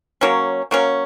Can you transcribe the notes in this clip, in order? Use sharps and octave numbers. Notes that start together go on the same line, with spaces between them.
F#3 A#3 C#4
F#3 A#3 C#4